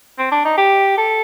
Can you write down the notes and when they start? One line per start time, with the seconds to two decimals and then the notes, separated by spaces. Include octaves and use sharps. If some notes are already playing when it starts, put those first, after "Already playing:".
0.19 C4
0.32 D4
0.45 D#4
0.58 G4
0.97 A4